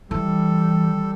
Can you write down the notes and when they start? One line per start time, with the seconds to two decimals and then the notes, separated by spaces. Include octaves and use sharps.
0.11 E3 G3 A4